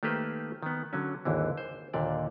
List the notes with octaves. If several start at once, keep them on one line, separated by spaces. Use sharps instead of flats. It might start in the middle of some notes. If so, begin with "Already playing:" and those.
D#3 A3 A#3 G4 B4 C5
D#3 B3
D3 F#3 C#4
G#1 D#2 D3 E3
C5
D#2 A#2 D3 D5